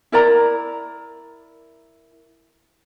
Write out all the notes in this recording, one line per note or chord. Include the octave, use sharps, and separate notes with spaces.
E4 A#4 D5 A#5